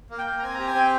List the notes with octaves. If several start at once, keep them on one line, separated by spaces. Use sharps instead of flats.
A#3
G5
A#3
A#5
C4 G#5
G4 A#5
G#5
C4 G5